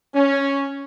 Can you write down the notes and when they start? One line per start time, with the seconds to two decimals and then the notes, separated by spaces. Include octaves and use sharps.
0.15 C#4